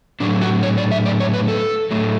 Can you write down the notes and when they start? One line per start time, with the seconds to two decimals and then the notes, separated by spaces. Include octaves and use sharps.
0.20 A2 F#3 A3 D4
0.42 F#4
0.63 C#5
0.78 D5
0.91 E5
1.06 D5
1.20 C#5
1.34 B4
1.48 A4
1.91 A2 F#3 A3